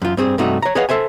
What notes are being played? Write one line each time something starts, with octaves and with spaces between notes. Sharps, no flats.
F#2 F4
G2 C4 G#4
G2 C3 A3 D#4 F#4
C#5 A#5
G#4 B4 C#5 D#5 F5 F#5
A4 C5 E5 G#5